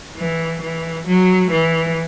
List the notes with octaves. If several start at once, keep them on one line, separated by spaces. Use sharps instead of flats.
E3
E3
F#3
E3